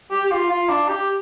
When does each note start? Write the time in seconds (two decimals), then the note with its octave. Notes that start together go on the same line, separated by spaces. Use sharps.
0.10 G4
0.26 G4
0.31 F4
0.49 F4
0.69 D4
0.89 G4